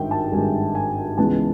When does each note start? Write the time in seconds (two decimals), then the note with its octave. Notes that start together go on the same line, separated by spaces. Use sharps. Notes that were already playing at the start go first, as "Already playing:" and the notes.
Already playing: G#1 G2 D#3 G#3 E5 G5
0.11 A5
0.32 G#1 G2 D#3 G#3 G#5
0.75 G#5
1.18 C#2 C#3 E3 G#3 B3 A5